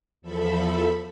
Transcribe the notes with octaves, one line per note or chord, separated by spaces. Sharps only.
E2 F3 A4 E5 B5